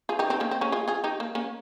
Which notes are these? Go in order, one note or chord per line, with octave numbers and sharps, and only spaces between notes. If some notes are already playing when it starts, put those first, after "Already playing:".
F4 G#4
D#4 G4
C4 D#4
A#3 C#4
C4
A#3 C#4
F4 G#4
F4 G#4
D#4 G4
A#3
A#3 C#4